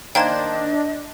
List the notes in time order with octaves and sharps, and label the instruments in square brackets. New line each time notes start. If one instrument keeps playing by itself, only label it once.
[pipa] D#3 A#3 C5 [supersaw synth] D4 [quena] D#5 [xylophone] G5 A5 G#6